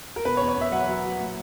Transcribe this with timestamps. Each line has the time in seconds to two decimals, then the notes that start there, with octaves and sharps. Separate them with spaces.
0.16 A#4
0.25 B2 B4
0.37 C#5
0.41 E2
0.48 C#5
0.56 E2
0.61 E5
0.72 F#3 F#5
0.88 F#3
1.05 F#3
1.20 A#2